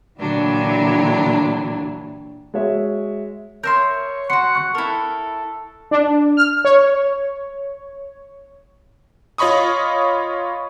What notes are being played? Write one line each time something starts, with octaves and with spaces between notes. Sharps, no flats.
A#2 D3 E3 F#3 G3 D4
G#3 F#4 C#5 E5
A#4 C#5 E5 C6 G6
F#4 F#5 C6 C#7
C#6 F#6
E4 A4 A#4
D4
F6
C#5
F4 C#5 D#5 B5 C#6 D#6